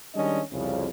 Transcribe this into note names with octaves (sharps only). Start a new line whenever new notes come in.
D#3 G3 G#3 C#4 D4 D#5
C2 F2 C#3